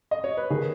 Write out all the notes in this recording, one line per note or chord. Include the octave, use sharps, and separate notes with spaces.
D#5
C#5
B4
D#3 G#4